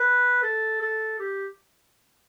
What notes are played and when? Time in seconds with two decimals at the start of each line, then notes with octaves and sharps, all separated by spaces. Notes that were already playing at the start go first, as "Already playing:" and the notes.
Already playing: B4
0.43 A4
0.81 A4
1.19 G4